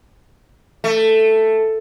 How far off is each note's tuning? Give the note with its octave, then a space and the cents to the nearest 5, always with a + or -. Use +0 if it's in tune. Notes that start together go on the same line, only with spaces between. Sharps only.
A3 +5